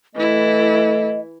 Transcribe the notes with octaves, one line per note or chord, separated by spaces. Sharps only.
E3 A3 E4 D#5